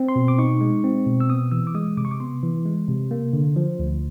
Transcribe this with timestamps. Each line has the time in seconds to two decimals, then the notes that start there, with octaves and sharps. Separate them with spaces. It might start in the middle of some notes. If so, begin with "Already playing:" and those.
Already playing: C4
0.09 C6
0.16 B2
0.28 D6
0.38 D#4 C#6
0.61 G#3
0.84 C4
1.07 B2
1.20 E6
1.30 B3 D#6
1.51 E3 E6
1.67 D6
1.75 G#3 D#6
1.97 C3 D6
2.05 C#6
2.11 D6
2.20 B3 C6
2.43 E3
2.65 G#3
2.88 C3
3.11 A#3
3.33 D3
3.56 F3
3.79 D2